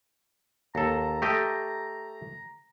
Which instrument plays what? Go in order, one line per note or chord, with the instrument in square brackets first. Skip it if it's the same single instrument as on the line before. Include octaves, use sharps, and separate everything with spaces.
[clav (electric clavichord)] D#2 A4 [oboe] A#5
[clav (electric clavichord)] A3 G4 D#5